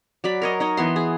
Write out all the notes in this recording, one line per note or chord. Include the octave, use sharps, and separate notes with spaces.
F#3 D5 B5
A#4 C#5 D#5
D#4 C#5 D#5
E3 B3 C6
G#4